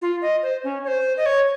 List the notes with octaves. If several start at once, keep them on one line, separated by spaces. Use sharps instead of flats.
F4
D#5
C5
C#4
C#5
C5
D#5
C#5